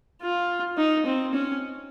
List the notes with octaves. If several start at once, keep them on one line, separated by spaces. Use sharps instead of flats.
F4
D#4
C4
C#4